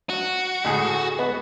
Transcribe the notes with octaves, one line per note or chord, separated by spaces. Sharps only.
F#4
D2 A2 G#4
B3